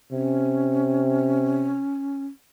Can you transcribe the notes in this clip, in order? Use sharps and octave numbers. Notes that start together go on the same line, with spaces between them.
C3 C#4